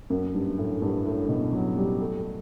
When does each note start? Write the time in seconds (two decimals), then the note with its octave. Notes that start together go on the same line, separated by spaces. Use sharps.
0.10 F#2
0.34 G2
0.58 A2
0.82 G2
1.05 A2
1.28 B2
1.53 F#3
1.77 G3
2.00 A3